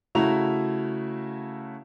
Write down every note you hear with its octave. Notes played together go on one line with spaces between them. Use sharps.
C#3 A3 E4 F#4 A#5 F7